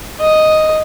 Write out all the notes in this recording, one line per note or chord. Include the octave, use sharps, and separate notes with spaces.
D#5